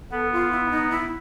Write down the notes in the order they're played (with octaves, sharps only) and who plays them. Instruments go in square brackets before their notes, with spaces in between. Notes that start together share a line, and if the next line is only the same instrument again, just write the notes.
[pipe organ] B3 [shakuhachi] A4
[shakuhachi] F4
E4
E4
D#4
E4